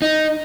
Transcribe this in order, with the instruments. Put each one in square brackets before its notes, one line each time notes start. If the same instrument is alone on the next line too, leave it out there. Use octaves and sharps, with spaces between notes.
[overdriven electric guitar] D#4